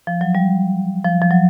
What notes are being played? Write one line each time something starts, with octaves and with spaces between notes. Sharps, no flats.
F3
F#3
G3
F3
F3
F#3